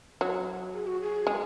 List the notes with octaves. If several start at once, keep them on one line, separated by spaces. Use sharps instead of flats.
F#3
G#4
F#4
G#4
G#3